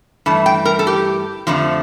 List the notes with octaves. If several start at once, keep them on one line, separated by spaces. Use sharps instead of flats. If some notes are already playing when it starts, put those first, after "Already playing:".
G2 E3 A3 A5
G5
A#4
A4
G4
F2 D3 F3 A3